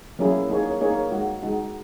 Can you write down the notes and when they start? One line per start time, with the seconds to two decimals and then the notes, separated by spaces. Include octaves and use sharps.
0.19 F#3 A#3 C#4 E4 G#4
0.50 A#3 D#4 G#4 C#5
0.81 A#3 D#4 G#4 C#5
1.11 G#3 D#4 F#4
1.43 G#3 D#4 F#4